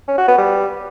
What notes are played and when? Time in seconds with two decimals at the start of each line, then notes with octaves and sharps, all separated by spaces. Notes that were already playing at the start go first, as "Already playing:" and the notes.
0.08 C#4
0.18 F#4
0.28 B3
0.38 G3